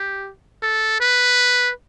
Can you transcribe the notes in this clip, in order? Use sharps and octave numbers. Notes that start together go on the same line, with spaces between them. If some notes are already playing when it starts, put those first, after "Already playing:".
Already playing: G4
A4
B4